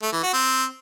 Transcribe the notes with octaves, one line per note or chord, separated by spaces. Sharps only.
A3
E3
F#4
C4